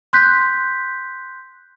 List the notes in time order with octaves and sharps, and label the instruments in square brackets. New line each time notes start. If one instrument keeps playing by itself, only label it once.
[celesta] C6 F#6 G6 B6